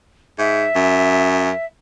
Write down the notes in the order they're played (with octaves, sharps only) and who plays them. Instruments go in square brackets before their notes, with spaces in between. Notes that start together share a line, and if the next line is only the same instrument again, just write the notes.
[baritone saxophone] G#2 [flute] E5
[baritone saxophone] F#2